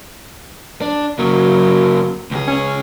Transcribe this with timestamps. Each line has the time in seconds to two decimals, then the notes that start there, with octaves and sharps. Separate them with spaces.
0.82 D4
1.19 C#3 F#3 A#3
2.31 C#2 G#4
2.47 C#4